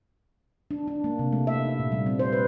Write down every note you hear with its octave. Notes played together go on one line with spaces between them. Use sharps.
D4
D4
A#3
C3
A3
E5
D#4
A#2
G3
C4
C5
B4